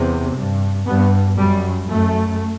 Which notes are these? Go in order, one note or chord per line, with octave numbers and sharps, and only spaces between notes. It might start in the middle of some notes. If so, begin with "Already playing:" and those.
Already playing: E2 C3
G2
G2 B3
F#2 G3
F#2 A3